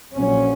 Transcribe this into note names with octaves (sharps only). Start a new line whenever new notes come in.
A#1 A#2 F#3 C#4